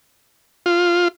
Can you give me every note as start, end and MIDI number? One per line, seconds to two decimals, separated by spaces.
0.66 1.08 65